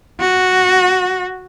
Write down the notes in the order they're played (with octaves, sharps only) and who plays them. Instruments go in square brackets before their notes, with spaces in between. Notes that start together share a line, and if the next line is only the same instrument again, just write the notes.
[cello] F#4